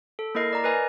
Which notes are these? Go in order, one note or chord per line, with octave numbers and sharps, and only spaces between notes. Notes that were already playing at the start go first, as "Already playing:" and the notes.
A4
A#3 E4 A#4 D#5 C7
D5 A#5
A#4 B4 D#5 G#5